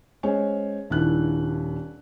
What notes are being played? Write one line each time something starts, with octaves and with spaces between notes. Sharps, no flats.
G#3 C#4 C5 C#5 G#5
D#1 G2 D#3 E4 F#6